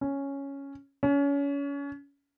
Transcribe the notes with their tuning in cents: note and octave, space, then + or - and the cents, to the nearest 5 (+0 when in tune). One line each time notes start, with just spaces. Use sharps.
C#4 +0
C#4 +30